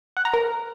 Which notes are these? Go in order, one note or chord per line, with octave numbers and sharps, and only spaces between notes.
F#5
A#5
A#4